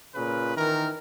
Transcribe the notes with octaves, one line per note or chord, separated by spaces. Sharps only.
A#2 C#3 B4
D#3 E3 A#4